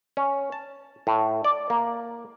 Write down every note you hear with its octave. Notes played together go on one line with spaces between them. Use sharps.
C#4
A5
A2
D5
A#3